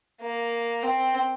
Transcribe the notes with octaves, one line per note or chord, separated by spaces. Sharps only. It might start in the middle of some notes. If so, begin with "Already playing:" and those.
A#3
C4